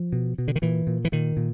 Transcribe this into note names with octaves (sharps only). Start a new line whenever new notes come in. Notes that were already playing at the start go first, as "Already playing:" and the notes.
Already playing: F3
B2
B2
D3
D#3
A#2 E3
A#2
E3
A#2 D#3
A#2